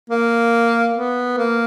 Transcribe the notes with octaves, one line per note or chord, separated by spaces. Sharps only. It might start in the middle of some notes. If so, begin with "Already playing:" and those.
A#3
B3
A#3